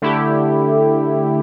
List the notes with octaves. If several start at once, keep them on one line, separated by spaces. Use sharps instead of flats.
D3 A3 E4 G4